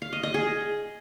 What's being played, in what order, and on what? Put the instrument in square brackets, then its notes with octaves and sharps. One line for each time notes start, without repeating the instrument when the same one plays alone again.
[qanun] F5
D#5
D#5
G#4